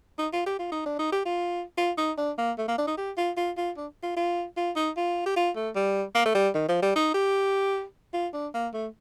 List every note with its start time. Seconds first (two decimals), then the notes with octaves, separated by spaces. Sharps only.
0.18 D#4
0.33 F4
0.46 G4
0.59 F4
0.72 D#4
0.86 D4
0.99 D#4
1.12 G4
1.25 F4
1.77 F4
1.97 D#4
2.17 D4
2.38 A#3
2.58 A3
2.68 A#3
2.78 D4
2.87 D#4
2.97 G4
3.17 F4
3.37 F4
3.57 F4
3.77 D4
4.03 F4
4.16 F4
4.57 F4
4.76 D#4
4.97 F4
5.26 G4
5.36 F4
5.56 A3
5.75 G3
6.15 A#3
6.25 A3
6.34 G3
6.54 D#3
6.68 F3
6.82 G3
6.95 D#4
7.14 G4
8.13 F4
8.33 D4
8.54 A#3
8.73 A3